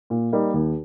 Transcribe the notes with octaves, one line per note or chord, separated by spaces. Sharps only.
A#2
G3 A#3 D#4
D#2